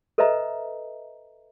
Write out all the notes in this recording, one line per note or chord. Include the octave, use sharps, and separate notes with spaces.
A4 B4 C5 D#5 E5 A#5